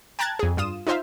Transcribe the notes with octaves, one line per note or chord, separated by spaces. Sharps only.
G5 A5 A#5 F#6 G#6 A6
F2 G#4
G2 F4 D#6 E7
D#4 F4 C5 E5 F5